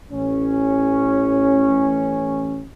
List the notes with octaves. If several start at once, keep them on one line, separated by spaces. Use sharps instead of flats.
A1 C#4